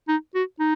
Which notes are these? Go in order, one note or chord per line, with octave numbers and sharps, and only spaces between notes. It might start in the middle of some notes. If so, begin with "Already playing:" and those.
D#4
F#4
D#4